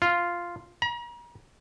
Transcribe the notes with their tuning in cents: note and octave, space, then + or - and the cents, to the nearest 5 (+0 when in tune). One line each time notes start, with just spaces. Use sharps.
F4 -5
A#5 +40